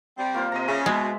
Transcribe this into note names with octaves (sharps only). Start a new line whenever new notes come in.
G3 C4
A#3 F4 C5
C3 D#5 A#5
C#3 E5
B2 G#3